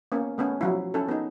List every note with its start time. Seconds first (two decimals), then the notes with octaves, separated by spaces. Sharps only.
0.12 A#3 B3 C#4
0.38 A3 B3 C#4
0.61 F3 F#3 E4
0.94 C#4 E4 A4
1.09 B3 D#4